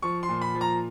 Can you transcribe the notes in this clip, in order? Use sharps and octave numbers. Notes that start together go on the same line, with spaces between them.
F3 C#6
C6
A#2
B5
F3
A#5